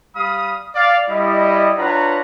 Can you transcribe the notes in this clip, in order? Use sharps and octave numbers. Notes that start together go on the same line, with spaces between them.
G3 F5 B5 D#6
D5 F5
G3 E4 D#5
D4 F4 B4 C#5 F#5 A#5